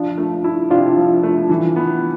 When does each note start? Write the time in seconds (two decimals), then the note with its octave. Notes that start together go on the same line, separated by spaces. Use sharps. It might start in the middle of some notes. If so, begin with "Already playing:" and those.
Already playing: F3 D4 F4
0.18 A3
0.44 E4
0.70 C3 D4 F4
0.97 F3
1.23 A3
1.50 E3
1.76 B3